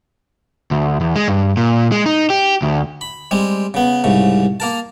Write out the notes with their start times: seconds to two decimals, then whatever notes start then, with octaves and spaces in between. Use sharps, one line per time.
0.71 D2
1.01 E2
1.16 G#3
1.28 G2
1.57 A#2
1.92 G#3
2.06 D#4
2.30 G4
2.62 D2
3.01 B5
3.31 G3 G#3 C4
3.74 C#3 B3
4.04 C2 G#2 C#3
4.60 A#3 A#4 A5